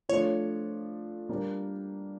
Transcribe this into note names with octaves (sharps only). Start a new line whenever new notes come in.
F3 A3 D4 F4 C#5
G3 A#3 D4 G4 A#4